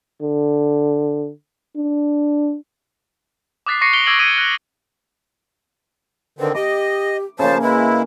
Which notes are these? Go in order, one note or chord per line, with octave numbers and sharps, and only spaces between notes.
D3
D4
D6 D#6 F#6 A6 B6 C7
C#6 A#6 C7 C#7
F#6 B6 C#7 D7 F7 G7
D6 E6 G#6 D7 F#7 G7
C#6 D#6 G#6 B6 C7 D#7
F#6
D3 D#3 C4 B4
G4 D#5 D6
C#3 F3 A#3 C5 C#5 A5
G#3 E4 B4